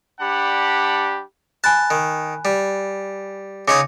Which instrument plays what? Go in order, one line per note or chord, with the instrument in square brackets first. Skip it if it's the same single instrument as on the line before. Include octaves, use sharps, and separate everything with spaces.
[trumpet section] G3 D4 G4 F#5 A5 B5
[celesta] G#5 B5 F#6 [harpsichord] A5
[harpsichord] D#3
G3
[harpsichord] C#3 D#4 C#5 [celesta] D6 A#6 C#7